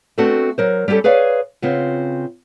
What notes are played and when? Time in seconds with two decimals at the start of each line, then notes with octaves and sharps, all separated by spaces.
0.18 A3 B3 C4 D4 F#4 A4
0.58 F#3 A#4 C5
0.88 G3 C#4 F#4 G4 A4
1.04 G#4 B4 C#5 D5 F5
1.62 C#3 B3 C4 F4